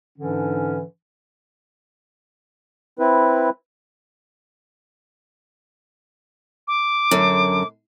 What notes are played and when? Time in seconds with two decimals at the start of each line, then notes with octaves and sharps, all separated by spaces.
0.18 G#2 D3 E3 C#4 D4
2.99 C4 E4 B4
6.68 D6
7.11 F#2 D3